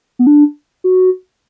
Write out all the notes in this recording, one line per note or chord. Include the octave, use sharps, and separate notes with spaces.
B3
D4
F#4